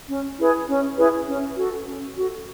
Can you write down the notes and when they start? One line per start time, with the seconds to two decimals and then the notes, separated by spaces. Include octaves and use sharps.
0.09 C#4
0.38 E4 G#4 B4
0.68 C#4
0.97 E4 G#4 B4
1.27 C#4
1.57 F#4 A4
1.87 C#4
2.16 F#4 A4